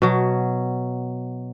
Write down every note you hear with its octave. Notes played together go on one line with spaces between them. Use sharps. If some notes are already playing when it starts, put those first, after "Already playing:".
B2 F#3